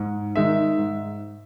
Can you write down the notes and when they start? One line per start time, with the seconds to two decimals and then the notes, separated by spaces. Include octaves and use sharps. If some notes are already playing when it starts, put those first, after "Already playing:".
Already playing: G#2
0.36 D#3 G#3 D#4 E5
0.78 G#2